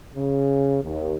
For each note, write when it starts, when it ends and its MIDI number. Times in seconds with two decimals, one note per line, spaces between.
0.16 0.77 49
0.83 1.15 39